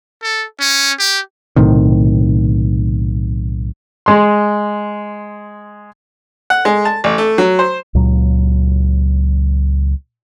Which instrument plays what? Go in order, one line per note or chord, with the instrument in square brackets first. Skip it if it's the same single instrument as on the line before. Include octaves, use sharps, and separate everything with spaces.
[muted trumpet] A4
C#4
G4
[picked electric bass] B1 A2 C3 D#3
[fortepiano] G#3 C6
F#5
G#3
A5
A1
A3
F#3
C5
[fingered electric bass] C#2 A#2 F#3